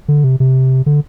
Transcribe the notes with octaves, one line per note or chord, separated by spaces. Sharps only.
D3
C3
C3
D3